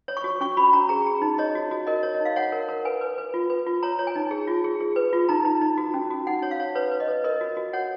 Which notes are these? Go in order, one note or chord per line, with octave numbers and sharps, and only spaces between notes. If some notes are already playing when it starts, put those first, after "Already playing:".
C#5
C#6
F#4
C#4 C#6
F#4 B5
C#4 A#5
G#4 A#5
G#4
D#4
C#5 D#5
F#4
F#4
A#4 D#5
C#5
D#5
D#4
F5
C#5 F#5
A#4
A#4
B4 G#5
B4
B4
F4
B4
F4
C#5 A#5
C#5
G#5
D#4
G#4
F4
G#4
G#4
B4
F4
D#4 A#5
D#4
D#4
F#4
C#4
F#4
D#4 F#5
C#5
F5
C#5
B4 C#5
B4
D#5
B4
A#4 D#5
F#4
F#4
C#5 F#5